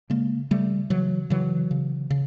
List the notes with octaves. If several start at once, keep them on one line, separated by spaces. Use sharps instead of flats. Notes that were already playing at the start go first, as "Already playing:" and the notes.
C#3 G#3 A#3
C#3 G3 A3
C#3 E3 F#3
C#3 E3 F#3
C#3
C#3